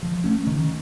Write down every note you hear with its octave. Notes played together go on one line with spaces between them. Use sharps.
F3
A3 C#4
D#3